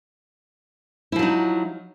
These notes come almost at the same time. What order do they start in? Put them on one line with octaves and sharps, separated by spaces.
E4 F3 F#3 D#4